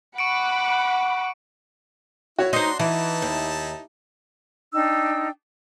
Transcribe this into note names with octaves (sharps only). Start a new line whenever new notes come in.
F#5 B5 C#6 D6 F#6 C#7 D7
E4 F#4 C#5
D4 D#4 C5 C6
E3 D#4 E4 A5
D#2
D4 D#4 G5 E6